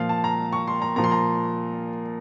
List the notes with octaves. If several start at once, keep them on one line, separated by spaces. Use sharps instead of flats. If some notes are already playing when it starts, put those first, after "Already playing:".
Already playing: A#2 F3 F5
A5
A#5
C#6
C6
A#5
A#2 F3 A#5
C6
A#5